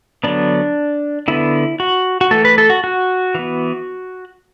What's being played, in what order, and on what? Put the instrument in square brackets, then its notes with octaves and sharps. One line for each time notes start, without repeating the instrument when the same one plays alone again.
[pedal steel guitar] D3 F#3 B3 D4
D3 B3 E4
F#4
F#4
E3 A3 A4
B4
A4
F#4
F#4
E3 B3